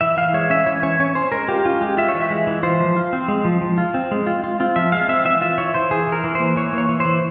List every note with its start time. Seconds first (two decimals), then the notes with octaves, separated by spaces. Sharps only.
0.01 E3 E5
0.17 E3 F5
0.33 G#3 C#5
0.50 C#4 E5
0.66 E3 C#5
0.83 C#4 C#5
1.00 C#4 C#5
1.15 C#4 C5
1.32 G#3 A#4
1.48 F4 G4
1.65 C#4 F4
1.81 G#3 G4
1.97 F4 E5
2.08 C#5
2.15 E3
2.21 E5
2.31 G#3
2.47 E3
2.63 F4 C5
2.80 F3
2.96 F4
3.13 C4
3.28 G#3
3.45 F3
3.61 F3
3.78 F4
3.94 C4
4.11 G#3
4.27 F4
4.44 F4
4.60 C4 F4
4.76 F3 E5
4.92 G#3 F5
5.08 C4 E5
5.25 E3 E5
5.41 F4 E5
5.58 E3 C#5
5.74 E3 C5
5.91 E3 G#4
6.08 E3 A#4
6.24 E3
6.35 A#3 C5
6.56 E3 C#5
6.73 A#3
6.78 C#5
6.89 E3
7.00 C5
7.05 E3